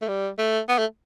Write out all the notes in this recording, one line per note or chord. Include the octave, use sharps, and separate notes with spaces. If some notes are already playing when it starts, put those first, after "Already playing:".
A3
G3
A3
B3
A3